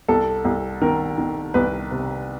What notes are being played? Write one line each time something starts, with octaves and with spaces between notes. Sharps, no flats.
C2 A4
C2
D#3 A#4
D#3
C2 B4
C3